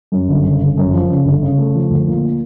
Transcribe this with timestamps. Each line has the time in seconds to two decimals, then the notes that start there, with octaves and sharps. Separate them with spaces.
0.12 F#2
0.28 G1
0.45 C#3
0.61 G1
0.77 F#2
0.93 F3
1.10 C#3
1.25 G1
1.43 C#3
1.58 A3
1.75 F3
1.90 D2
2.07 A#2